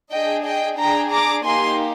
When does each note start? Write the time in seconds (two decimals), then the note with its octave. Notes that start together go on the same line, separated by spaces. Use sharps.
0.12 D4 G#4 D#5 G5
0.45 D#5 G5
0.78 D4 G#4 G5 A#5
1.11 A#5 D6
1.44 A#3 D#4 G4 G#5 C6